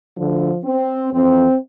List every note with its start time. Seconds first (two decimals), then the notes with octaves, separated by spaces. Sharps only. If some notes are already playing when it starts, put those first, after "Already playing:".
0.16 D2 D3 F3
0.65 C4
1.13 F2 E3 C4